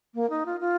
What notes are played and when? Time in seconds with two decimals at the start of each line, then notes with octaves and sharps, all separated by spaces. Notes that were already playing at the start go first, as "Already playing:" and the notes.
0.15 A#3
0.30 D#4
0.46 F4
0.60 F4